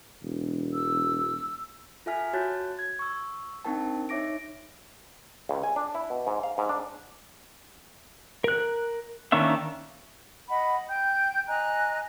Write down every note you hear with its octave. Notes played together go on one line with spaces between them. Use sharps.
E1
E6
F4 A4 E5 G#5 F6 B6
F#4 C#5 A5 F#6 G6 A6
G#6
C#6 E6
C4 D4 D#4 A#4 G5 A5
D#4 C#5 E5 D6 A#6 D7
C#2
G#5
D4
E4
B2
G#2
F5
G#2
D4
A#4 F#6
D#3 A#3 C#4 D4 E5
D#5 F#5 B5
G5 G6
D#5 G#5 A#5 F#6